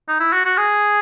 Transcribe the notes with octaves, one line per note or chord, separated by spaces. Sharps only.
D#4
E4
F#4
F#4
G#4